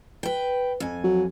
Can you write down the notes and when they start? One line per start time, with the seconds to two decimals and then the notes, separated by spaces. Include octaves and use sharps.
0.23 B4 G5
0.80 F2 G#5
1.04 F#3